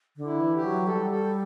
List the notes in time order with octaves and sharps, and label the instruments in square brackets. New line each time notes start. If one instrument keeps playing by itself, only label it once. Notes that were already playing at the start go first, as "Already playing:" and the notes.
[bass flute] D3
[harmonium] E4
[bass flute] E3
[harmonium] G4
[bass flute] F#3
[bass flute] G3 [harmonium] A4
[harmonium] A4